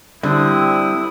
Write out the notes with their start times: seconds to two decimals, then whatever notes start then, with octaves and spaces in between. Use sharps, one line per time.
0.23 D3 G3 C4 E4 D#6